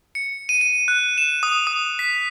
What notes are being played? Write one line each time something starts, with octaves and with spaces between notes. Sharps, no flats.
C#7
D#7
D#7
F#6
E7
D#6
D#6
B6